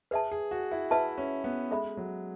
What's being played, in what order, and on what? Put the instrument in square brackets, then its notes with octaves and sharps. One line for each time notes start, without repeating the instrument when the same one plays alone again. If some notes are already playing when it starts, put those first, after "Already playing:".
[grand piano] G#4 [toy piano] B4 E5 A5
[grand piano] G#4
F#4
E4
[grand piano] E4 [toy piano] B4 E5 A5
[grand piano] C#4
B3
[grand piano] G#3 [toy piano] A4 E5 B5
[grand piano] F#3